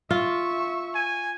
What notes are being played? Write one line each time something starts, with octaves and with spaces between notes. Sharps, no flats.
F4 E5 C#6
G#5